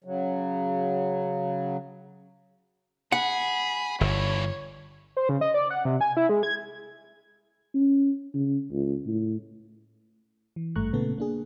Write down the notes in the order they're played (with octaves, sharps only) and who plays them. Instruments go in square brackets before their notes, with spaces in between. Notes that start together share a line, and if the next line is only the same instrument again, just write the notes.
[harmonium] C#3 F#3
[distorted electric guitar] G#4 [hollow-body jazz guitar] F#5 [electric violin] B5
[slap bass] G1 [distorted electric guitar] G2 E3 [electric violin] C#5
[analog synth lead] C5
C#3
D#5
D5
F#5
C3
G#5
E4
G#3
G#6
[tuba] C#4
C#3
C#2
A2
[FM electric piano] E3
G#1 G2 A3 A#5 C#6 F#6
A#2 C#3 A3 B3 A4
A#3 D4 G#4